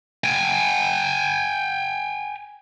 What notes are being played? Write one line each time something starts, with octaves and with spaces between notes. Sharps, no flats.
G5 G#5